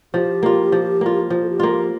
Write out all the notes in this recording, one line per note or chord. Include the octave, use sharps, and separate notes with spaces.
F3 G4
A#3 F4
F3
A#3 F4
F3
A4
G4
A#3 F4
G4